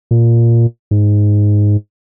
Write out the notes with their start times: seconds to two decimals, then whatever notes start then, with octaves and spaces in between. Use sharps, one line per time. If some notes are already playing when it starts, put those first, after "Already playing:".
0.11 A#2
0.91 G#2